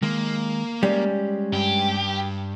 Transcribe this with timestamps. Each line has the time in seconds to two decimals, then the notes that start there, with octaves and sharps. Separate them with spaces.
0.02 D#3 G#3 A#3
0.83 G3 G#3 C#4
1.53 G2 G4